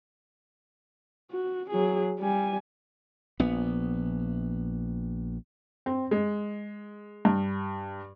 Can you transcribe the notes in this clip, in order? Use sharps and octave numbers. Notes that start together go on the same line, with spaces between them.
F#4
F#3 G#4
G3 G#5
A#1 B3
C4
G#3
G2